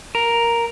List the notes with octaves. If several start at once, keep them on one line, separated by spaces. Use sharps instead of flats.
A#4